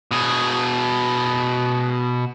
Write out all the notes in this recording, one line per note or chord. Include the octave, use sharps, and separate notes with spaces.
B2 G#4